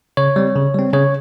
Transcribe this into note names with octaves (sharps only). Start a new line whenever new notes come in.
C#3 C#5
G3 C4
C#3
G3 C4
C#3 C#5